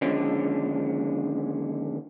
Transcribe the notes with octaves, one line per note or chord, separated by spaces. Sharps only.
D#2 D3 F3 G#3 C#4 D4